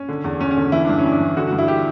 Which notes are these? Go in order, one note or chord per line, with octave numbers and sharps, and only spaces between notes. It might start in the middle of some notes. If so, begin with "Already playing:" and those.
Already playing: C#4
D3
E2
E2 C#4
C#4
D3
E3 E4
G2 D4
C#4
G2
D4
E3
D3 F#4
F#4
G2
E4
G4